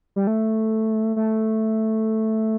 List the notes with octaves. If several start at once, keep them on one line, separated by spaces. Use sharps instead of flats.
G3
A3
A3